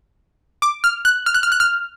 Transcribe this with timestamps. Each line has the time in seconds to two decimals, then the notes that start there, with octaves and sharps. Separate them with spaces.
0.62 D6
0.84 F6
1.05 F#6
1.26 F6
1.34 F#6
1.43 F6
1.52 F#6
1.60 F6